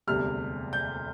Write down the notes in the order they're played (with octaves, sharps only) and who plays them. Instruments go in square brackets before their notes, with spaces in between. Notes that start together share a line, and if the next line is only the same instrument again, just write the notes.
[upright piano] E1 D2 C3 G3 F6
G6